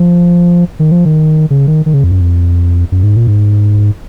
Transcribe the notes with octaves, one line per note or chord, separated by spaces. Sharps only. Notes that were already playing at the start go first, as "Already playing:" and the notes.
Already playing: F3
D#3
F3
D#3
C#3
D#3
D#3
C#3
F2
F#2
F2
F#2
G#2
A#2
G#2